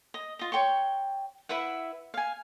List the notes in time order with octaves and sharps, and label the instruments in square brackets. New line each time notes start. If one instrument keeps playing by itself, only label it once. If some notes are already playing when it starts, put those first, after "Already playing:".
[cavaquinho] D#5
F4 D#5
C#5 G5 C6 C#6
E4 B4 E5 F#5
F5 G#5